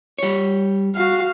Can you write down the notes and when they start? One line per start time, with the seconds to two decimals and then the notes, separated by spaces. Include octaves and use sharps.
0.19 G3 C#5
0.95 F#4 F5